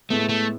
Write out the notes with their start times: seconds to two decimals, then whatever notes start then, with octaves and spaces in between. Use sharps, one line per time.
0.10 A2 G#3 A3 B3
0.29 A3